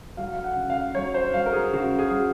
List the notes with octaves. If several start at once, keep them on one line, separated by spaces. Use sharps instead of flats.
F#3 F5
F5
F#5
C#3
F5
F#3 C#5
C5
F#3 F5
A#4
G#4
C#3 F#4
G#4
F#3